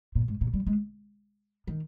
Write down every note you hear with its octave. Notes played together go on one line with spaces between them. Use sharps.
A#2
G#2
A#2
G3
G#3
D#3